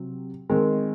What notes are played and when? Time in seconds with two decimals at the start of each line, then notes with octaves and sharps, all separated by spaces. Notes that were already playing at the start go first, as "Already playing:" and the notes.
Already playing: C3 F#3 C4
0.50 D#3 G#3 C4